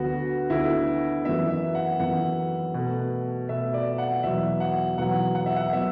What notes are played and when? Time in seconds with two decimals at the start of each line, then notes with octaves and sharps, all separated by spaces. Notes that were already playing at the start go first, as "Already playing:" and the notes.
Already playing: D2 D3 B3 F#4
0.50 D2 D3 B3 E4
1.25 F#2 E3 B3 E5
1.50 E5
1.75 F#5
2.00 F#2 E3 B3 F#5
2.74 B2 A3
3.48 B2 A3 E5
3.74 D5
3.98 F#5
4.23 E2 B2 F#3 E5
4.60 F#5
4.98 E2 B2 F#3 F#5
5.35 F#5
5.46 E5
5.57 F#5
5.73 F#3 B3 E5